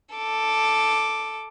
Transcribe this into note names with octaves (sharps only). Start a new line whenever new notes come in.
A4 D6